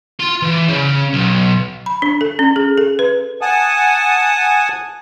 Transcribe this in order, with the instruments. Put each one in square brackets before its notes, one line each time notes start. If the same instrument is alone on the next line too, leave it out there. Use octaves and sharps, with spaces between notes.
[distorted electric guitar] F4 C6
E3
C#3
B1
[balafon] B5
D4
A4
C#4
G#4
A4
B4
[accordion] F#5 G#5 A5 D#6